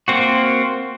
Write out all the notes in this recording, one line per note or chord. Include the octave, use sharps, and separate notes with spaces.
A#3 C4 F#4